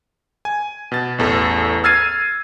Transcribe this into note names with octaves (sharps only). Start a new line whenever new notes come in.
G#5
B2 A6
A1 E2 A4
E6 F6 G#6 A6 C7 D#7